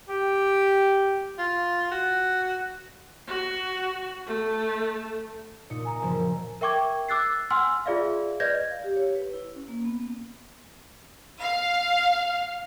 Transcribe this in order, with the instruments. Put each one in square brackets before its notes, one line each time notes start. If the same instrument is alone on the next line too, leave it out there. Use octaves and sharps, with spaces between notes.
[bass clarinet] G4
[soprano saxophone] F4
F#4
[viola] F#4
A3
[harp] A#2 D#4 C#7
[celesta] G#5 A#5
[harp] F#1 F3
[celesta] A#4 E5 G5 C#6 D6 G#6
D6 E6 F#6 A6 C7
F#5 G#5 C6 E6 F6
F4 G#4 D5 E5 F5
B4 D5 D#5 G6 G#6 A#6
[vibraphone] F5
G4
C#5
B4
E4
C#4
A#3
B3
[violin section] F5